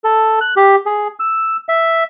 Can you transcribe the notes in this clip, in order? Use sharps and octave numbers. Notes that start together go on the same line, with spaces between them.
A4
F#6
G4
G#4
E6
E5